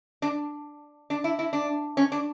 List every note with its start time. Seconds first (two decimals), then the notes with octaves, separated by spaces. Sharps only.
0.22 D4
1.10 D4
1.24 E4
1.39 E4
1.53 D4
1.97 C#4
2.12 D4